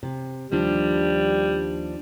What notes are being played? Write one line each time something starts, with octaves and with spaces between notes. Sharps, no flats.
C3
D#2 F3 G3 D4